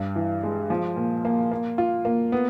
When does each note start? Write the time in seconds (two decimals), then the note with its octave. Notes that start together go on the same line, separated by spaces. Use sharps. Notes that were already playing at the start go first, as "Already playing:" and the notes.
Already playing: G2
0.16 E3
0.43 G#3
0.70 F3
0.96 A#2
1.25 A#3
1.51 A#3
1.78 F4
2.05 A#3
2.32 B3